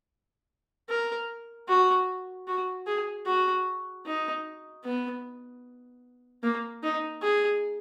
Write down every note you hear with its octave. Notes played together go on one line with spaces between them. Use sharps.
A#4
F#4
F#4
G#4
F#4
D#4
B3
A#3
D#4
G#4